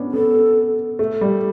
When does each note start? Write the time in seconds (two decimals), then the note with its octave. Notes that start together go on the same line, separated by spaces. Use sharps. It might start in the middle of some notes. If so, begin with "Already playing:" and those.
Already playing: B3 C#4 D4
0.14 B3 A4
0.99 A3
1.21 G3